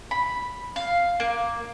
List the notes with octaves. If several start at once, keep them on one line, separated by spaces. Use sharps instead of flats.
B5
F5
A#3